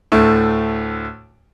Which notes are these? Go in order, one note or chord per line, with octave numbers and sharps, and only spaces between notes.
D2 A2 A3